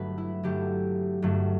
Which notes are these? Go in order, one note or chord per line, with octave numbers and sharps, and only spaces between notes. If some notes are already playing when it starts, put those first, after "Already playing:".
Already playing: G1 G2 F#3 A3 B4
E4
G1 G2 F#3 A3 G4
G1 G2 F#3 A3